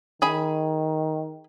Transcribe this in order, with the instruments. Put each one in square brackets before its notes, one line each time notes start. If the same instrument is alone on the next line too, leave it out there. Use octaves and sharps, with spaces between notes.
[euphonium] D#3 [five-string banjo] G#4 B5